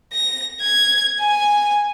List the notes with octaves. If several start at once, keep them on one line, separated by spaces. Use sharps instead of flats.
A#6
G#6
G#5